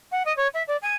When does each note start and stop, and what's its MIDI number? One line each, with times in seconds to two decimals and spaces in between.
0.11 0.23 78
0.25 0.35 75
0.36 0.47 73
0.54 0.63 76
0.67 0.76 74
0.82 0.96 80